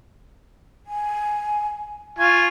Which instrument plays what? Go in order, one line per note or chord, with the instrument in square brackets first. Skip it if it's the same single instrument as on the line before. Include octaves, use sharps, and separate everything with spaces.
[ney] G#5
[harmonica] F4 [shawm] G#5 [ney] C#6